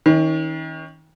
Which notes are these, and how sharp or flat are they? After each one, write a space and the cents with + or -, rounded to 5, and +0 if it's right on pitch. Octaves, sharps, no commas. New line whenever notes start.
D#3 +35 C#4 +0